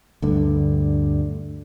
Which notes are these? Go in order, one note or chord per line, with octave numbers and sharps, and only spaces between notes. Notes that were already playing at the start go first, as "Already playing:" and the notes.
D2 G2 D3